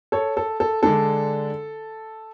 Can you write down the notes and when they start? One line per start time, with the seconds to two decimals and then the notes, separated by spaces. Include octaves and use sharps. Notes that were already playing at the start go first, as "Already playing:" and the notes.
0.12 A4 C#5
0.37 A4
0.60 A4
0.83 D3 G#3 D4 A4